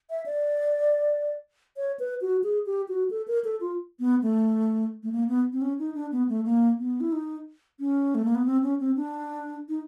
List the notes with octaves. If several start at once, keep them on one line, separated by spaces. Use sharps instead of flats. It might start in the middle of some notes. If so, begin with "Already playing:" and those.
E5
D5
C#5
B4
F#4
G#4
G4
F#4
A4
A#4
A4
F4
B3
A3
A3
A#3
B3
C4
C#4
D#4
D4
B3
A3
A#3
B3
E4
D#4
C#4
A3
A#3
B3
C4
C#4
C4
D4
D#4